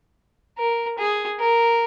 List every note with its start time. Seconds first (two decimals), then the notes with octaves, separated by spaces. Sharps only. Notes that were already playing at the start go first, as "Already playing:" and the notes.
0.58 A#4
0.99 G#4
1.40 A#4